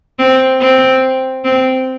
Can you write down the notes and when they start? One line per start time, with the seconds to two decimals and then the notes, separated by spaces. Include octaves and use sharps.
0.19 C4
0.60 C4
1.44 C4